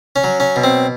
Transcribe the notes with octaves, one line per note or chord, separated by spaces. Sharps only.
C#4
F#3
C#4
B2
C4